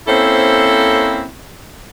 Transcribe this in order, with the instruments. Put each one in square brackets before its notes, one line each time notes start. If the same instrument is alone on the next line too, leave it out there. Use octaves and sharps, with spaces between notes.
[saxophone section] A#3 C4 C#4 E4 A4 C5